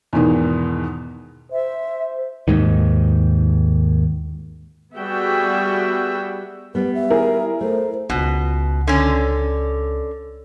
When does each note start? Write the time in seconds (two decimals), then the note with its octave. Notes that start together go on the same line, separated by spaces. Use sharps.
0.13 E2 G#2 B2 D#3
1.52 C5 E5
2.48 D#2 G#2 D#3
4.96 G3 B3 F#4 G#4 E5 G5
6.75 G3 B3 B4
6.95 E5
7.10 E4 G#4 A#4
7.61 A3 C5
8.10 C#2 B2 D#4
8.87 D3 C#4